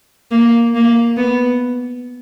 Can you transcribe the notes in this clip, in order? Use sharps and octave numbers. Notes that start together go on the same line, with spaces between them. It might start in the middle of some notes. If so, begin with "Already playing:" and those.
A#3
A#3
B3